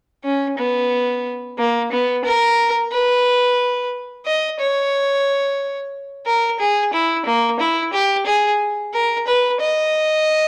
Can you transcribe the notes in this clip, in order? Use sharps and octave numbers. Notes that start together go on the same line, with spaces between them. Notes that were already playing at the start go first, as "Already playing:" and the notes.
C#4
B3
A#3
B3
A#4
B4
D#5
C#5
A#4
G#4
E4
A#3
E4
G4
G#4
A#4
B4
D#5